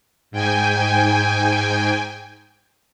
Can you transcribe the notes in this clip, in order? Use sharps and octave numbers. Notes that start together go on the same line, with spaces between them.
G#2 G5 G#5